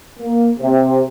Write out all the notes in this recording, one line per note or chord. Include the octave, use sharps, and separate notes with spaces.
A#3
C3